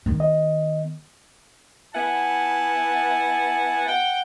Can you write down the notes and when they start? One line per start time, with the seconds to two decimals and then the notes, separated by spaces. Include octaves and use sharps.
0.06 D#3 B3
0.20 D#5
1.95 B3 E4 F#5 G#5 A5
3.88 F#5 G5